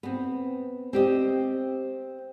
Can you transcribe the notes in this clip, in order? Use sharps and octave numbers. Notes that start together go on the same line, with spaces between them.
B3 C4
C4 G4 D#5